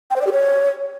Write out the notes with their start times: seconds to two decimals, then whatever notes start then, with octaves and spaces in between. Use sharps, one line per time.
0.11 G5
0.16 C5
0.21 D5
0.27 G4
0.32 C#5